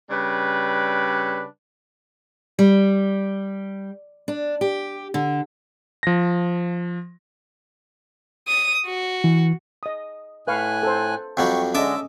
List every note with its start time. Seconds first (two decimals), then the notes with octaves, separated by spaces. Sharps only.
0.11 C#3 G3 D4 B4
2.59 G3
4.28 D4
4.61 G4
5.14 D3
6.03 F3 A#6
8.48 D#6
8.86 F#4
9.24 E3
9.83 D#5 D#6
10.47 A2 B4 F5 G#5 C#6 F#6
10.83 A4 C5
11.37 F2 F#3 G3 C#6
11.75 D3 G#3 C#4 A4 D#5 E5 D6